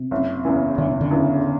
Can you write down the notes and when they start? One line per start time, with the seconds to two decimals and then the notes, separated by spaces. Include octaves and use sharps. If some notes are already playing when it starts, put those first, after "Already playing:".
Already playing: C3
0.11 F#1
0.45 E2 C#3 E3
0.78 F#1 D3
0.90 C#3
1.01 D3
1.11 E2 C#3 E3